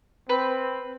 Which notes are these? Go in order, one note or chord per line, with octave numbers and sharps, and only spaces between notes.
C4 B4